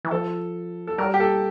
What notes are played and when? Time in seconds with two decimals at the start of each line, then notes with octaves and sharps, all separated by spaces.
0.05 E3
0.11 F3 A4
0.87 A4
0.98 G3 A#4
1.14 G4
1.20 A4